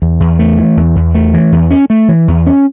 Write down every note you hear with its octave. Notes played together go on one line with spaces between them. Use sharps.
E2
E2
A3
E3
E2
E2
A3
E3
E2
C#4
A3
E3
E2
C#4